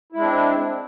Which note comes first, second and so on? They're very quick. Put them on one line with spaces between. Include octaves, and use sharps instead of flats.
E4 G#3 D4 C4